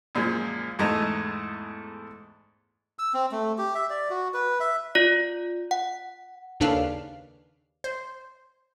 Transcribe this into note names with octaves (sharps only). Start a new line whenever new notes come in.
F#2 A#2 F3 G#3
E2 G#2 A3 A4 D#5 A#5
E6
C4
A3
G4
E5
D5
F#4
B4
E5
F4 D5
F#5
D#2 C#3 D4 A4 B4 F5
C5